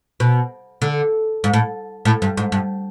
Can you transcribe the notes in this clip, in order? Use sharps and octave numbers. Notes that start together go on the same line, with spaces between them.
B2
D3
G#2
A2
A2
G2
G#2
G2